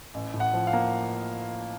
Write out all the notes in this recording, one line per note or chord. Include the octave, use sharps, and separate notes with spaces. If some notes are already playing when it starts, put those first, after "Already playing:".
A1
A2
F#5
F3
F5
A#3